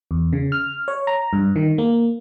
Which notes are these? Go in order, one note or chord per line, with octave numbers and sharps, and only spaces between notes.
E2
C#3
F6
C#5
A#5
G2
D#3
A#3